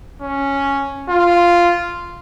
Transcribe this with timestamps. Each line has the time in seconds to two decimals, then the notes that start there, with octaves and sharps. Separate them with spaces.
0.21 C#4
1.09 F4